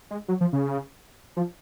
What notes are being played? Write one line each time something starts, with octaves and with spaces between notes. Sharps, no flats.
G#3
F#3
F3
C#3
F3